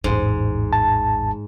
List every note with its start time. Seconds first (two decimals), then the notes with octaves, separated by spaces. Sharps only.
0.04 A1 E2 G#2
0.73 A5